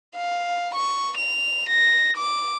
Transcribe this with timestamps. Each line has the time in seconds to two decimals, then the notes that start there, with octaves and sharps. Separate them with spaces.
0.15 F5
0.75 C#6
1.17 F7
1.69 A#6
2.17 D6